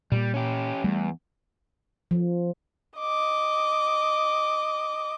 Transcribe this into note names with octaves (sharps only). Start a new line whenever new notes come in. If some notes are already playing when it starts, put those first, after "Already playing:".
A#2 G3 A#3
C#4 G4
E2 G3 A3
F3
D#5 D6